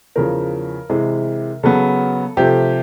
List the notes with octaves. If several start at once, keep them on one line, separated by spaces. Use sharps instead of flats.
E2 C#3 F3 A#4
C3 E3 G#3
C#3 F#3 B3 A4
C3 F3 A3 G4